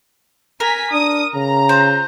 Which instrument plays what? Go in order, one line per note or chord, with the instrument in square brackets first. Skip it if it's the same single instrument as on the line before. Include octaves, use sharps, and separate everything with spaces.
[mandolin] A#4 [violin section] G#5 A#5 B6
[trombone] D4 [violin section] D#6
[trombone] C#3 [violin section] A#5
[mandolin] F4 C5